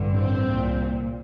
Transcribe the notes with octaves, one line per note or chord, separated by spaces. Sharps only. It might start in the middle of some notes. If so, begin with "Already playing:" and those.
Already playing: A1 G2 D3
C4
C2 A#2